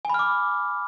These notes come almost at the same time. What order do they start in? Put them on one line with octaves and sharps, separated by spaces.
G#5 B5 F6 D6